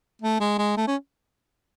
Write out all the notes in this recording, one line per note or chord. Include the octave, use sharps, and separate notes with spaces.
A3
G#3
G#3
A3
C#4